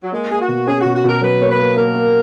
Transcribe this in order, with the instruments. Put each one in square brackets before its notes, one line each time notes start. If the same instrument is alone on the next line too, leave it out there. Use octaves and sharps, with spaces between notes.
[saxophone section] F#3
[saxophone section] G#3 [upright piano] A#3
[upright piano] A#3 [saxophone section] G#4
[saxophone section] F#4
[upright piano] B2
[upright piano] C#4 [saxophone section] G#4
[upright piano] B2 [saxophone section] F#4
[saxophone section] F#4
[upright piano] B2 [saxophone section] A#4
[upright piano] F#3 [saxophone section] B4
[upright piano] A#3 [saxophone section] C#5
[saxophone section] B4
[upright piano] A#3
[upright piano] A#3 [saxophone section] A#4
[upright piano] A#3